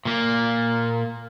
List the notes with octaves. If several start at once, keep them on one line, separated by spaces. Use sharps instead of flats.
A#2 A#3